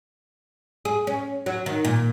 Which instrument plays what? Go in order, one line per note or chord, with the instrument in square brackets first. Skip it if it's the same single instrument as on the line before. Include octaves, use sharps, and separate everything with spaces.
[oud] G#4
C#4
F#3
D#3
A#2